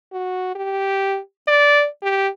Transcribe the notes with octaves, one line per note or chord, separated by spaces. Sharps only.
F#4
G4
D5
G4